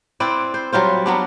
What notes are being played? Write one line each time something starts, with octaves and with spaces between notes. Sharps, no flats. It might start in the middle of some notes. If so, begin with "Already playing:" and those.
C4 E4 B4 D5
C5
F#3 G3 F4 C5
F#3 B3 D4